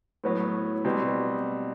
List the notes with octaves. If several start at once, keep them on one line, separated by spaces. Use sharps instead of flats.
A2 F#3 B3
B2 G3 C4